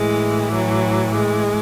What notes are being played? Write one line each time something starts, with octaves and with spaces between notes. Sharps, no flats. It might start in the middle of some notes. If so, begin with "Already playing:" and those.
Already playing: A2 E3 G#3
F#3
G#3